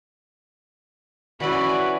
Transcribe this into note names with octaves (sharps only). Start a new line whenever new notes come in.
E3 C#4 E4 F#4 B4 D5 G#5